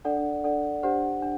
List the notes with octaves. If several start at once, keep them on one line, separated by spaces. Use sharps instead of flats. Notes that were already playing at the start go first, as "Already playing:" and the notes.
D4 A4 D5 F#5
D4 A4 D5 F#5
D4 G4 C5 F#5
D4